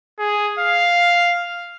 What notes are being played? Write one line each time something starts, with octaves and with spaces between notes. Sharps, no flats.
G#4
F5